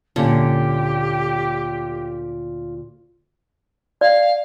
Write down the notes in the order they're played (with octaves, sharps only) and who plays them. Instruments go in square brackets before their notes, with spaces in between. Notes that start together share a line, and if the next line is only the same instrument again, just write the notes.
[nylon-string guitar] D2 A#2 C#4 [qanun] D3 [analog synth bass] F4 [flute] G4
[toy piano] D5 [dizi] F5